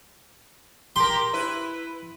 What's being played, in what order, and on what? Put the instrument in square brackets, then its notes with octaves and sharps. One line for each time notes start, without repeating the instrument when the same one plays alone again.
[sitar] G4 A#4 [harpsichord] C6
[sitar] E4 B4